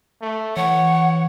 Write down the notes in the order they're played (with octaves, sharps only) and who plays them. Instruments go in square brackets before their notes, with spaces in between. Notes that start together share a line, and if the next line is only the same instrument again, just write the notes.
[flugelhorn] A3
[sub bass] E3 [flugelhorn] C#5 [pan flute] F#5